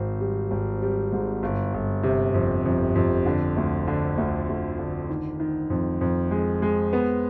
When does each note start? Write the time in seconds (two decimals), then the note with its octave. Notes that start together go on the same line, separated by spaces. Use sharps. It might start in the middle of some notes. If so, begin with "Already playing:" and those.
Already playing: G#1 C4
0.20 G3
0.51 G#1
0.82 G3
1.12 G#2
1.43 G1
1.74 G1
2.03 C3
2.34 F2
2.65 F2
2.95 F2
3.26 D3
3.57 D2
3.88 D3
4.18 D2
4.49 D2
4.78 D3
5.09 D#3
5.40 D#3
5.70 F2
6.01 F2
6.31 G#3
6.62 G#3
6.93 B3